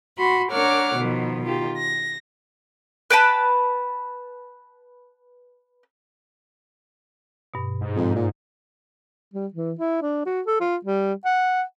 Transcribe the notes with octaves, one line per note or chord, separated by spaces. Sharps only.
F#4 B5 C6
D4 A#4 C#5 F#5 D6 F6
B2 D#3 F3
D#3 F4 G4
A#6
B4 G5 A5 B5
G2 B2
G#2
F2
A#2
G3
E3
E4
D4
F#4
A4
F4
G3
F#5